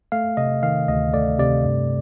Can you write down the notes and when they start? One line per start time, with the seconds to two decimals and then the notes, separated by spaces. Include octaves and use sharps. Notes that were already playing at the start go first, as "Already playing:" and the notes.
0.12 A3 F5
0.37 C3 D#5
0.63 D#3 F5
0.88 D2 D#5
1.14 A3 D5
1.39 C3 D5
1.64 G2